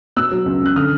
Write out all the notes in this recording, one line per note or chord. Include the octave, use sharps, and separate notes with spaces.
B2 E6 F#6
F#3
C#2
C#2 F#6
D3 D#6 F6